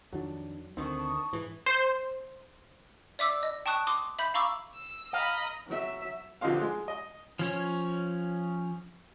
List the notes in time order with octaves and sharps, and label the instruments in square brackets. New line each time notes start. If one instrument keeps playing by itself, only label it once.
[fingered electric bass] F2 D#3 D4 [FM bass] F#3
[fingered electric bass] D2 D3 D#3 [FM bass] C4 [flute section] A5 C#6 D#6
[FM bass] G#2 [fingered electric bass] E3
[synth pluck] C5
[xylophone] D5 E5 D6 E6
D#5
G5 A5 C#6 D#6 F#6
C6 D6 D#6
E5 B5 G6
F5 A#5 B5 C#6 D6 E6
[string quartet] E6
[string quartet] D#5 A#5 B5 [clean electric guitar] F5
[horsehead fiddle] F#3 E5
[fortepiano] B1 D3 F3 D#4 C5 F5
G#3
D#5
[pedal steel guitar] F3 C#4 C#5